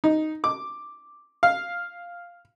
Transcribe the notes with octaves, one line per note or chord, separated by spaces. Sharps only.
D#4
D6
F5